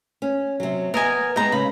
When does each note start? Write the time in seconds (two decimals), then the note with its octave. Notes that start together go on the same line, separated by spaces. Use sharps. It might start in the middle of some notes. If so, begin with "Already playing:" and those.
0.22 C#4
0.60 C3 F#3
0.94 B3 A#4 D#5 G#5
1.36 G#3 B3 D#4 G4 A#5
1.52 C#3 B5